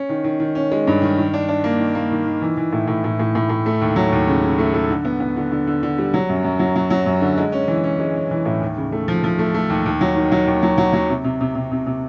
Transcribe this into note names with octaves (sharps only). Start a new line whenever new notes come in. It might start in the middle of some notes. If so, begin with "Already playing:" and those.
Already playing: C#4
D#3
D#3
D#3
C#4
G#3
G2
D#3
D#3
D4
D4
A#3
D#3
A#3
D#3
D#3
E3
E3
A2
A2
A2
A2
A2
A2
A3
D#2
F#3
D#2
C#3
C#3
A3
A3
D3
B3
B3
D3
D3
D3
D3
G3
F#3
F#2
F#2
F#3
F#3
F#3
F#2
D3
G#3
C#4
E3
C#4
G#3
C#4
E3
A2
D#2
C#3
A3
F3
F3
A3
A3
D#2
D#2
F#3
D#3
F#3
D#2
F#3
F#3
F#3
C3
C3
C3
C3
C3
C3